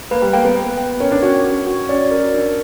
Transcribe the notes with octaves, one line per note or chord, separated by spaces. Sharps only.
A#3 B4
G3
A#3 G5
B3
B4
G5
C#4 A#4
D4
C#4 F#4
F#4
F#4
C#4 D5
A#4
D4